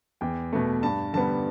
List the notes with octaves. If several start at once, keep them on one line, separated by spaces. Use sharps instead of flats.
E2 G5
B2 A3
G2 A5
D3 G3 B3 A5